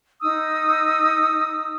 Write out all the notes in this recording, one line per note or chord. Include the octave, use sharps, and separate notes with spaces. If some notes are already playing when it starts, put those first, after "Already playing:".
D#4 D#6 E6